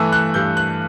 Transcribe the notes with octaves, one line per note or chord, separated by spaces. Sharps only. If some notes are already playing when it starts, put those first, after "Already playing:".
Already playing: G2 E3 A3 E6 F#6
F#6
G2 G6
F#6